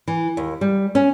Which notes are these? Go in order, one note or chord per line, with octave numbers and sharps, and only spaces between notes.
E3
D#2
G3
C#4